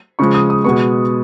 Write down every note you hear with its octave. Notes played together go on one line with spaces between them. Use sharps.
C#3 F3 G#3 C#6
D#6
D#6
B2 G#3 B3 C#6